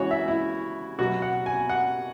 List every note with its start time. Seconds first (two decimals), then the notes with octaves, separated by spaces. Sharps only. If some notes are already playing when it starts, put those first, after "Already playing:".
Already playing: C#3 E3 G#3 F#4 C#5
0.11 E5
0.28 E4
0.99 B2 F#3 F#4
1.22 F#5
1.46 G#5
1.69 F#5